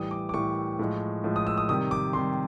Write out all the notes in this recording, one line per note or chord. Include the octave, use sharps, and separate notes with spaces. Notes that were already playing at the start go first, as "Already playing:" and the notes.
Already playing: A2 E3 G3 D#6
D6
D6
A2 E3 G3 C#6
A2 F3 G#3
A2 F3 G#3
D#6
E6
D#6
C3 D#3 G3 D#6
D6
C3 D#3 G3 C6